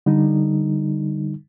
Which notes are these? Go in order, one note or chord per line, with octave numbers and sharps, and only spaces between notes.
D3 G3 D#4